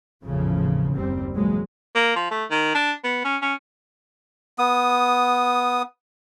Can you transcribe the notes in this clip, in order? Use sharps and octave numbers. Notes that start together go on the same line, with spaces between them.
G#1 E2 A2 C#3 F3
F#1 D#2 G3 C4
B2 E3 F#3 G#3 A#3
A#3
F3
A3
D#3
D4
B3
C#4
C#4
B3 D#6